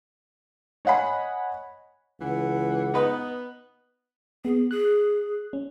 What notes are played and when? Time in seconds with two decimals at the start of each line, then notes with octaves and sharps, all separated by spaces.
0.85 C#5 D#5 F#5 G#5 B5
2.21 C#2 E3 F#5
2.94 B3 D#4 B4
4.45 B3 G#4
4.71 G#4 F#6
5.53 C#4